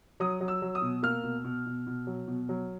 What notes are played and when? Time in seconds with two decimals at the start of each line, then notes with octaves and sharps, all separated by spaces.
0.20 F#3 D#6
0.41 F#3
0.48 E6
0.62 F#3
0.75 D#6
0.82 B2
1.03 A#3 F6
1.24 B2
1.44 B2
1.66 B2
1.87 B2
2.07 F#3
2.28 B2
2.49 F#3